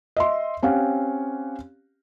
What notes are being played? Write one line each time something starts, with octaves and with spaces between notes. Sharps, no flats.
D#5 E5 C6
C4 C#4 G4 F5 F#5